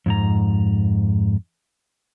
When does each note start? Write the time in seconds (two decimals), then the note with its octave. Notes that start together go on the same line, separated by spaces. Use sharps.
0.06 F2 G#2 A#5